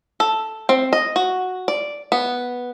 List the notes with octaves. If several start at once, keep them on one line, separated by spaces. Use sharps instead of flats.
A4
C4
D#5
F#4
D5
B3